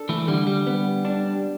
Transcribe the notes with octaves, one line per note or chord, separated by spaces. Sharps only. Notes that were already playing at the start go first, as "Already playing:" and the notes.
Already playing: D4 A4
E3 A3
D3 G3
G3
B3
D4